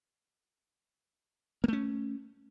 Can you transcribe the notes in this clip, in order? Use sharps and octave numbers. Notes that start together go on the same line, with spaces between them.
A3 A#3 C#4